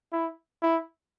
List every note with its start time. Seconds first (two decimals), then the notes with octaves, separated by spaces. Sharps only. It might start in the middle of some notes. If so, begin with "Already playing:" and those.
0.12 E4
0.62 E4